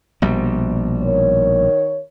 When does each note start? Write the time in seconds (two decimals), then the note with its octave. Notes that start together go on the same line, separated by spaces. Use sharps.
0.22 A#1 B2 G3
1.03 D#3 A#4 C#5